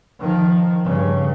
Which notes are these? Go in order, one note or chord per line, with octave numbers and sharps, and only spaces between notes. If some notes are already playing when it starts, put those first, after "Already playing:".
D#3 F3
G2 C#3